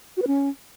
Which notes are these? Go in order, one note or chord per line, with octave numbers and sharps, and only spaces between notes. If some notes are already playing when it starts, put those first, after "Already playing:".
F#4
B4
C#4